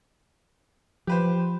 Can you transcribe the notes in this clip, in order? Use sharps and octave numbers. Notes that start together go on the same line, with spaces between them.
F3 G4 B4 C5